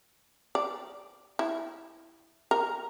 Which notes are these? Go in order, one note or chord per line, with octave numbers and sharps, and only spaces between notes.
D5
E4
A#4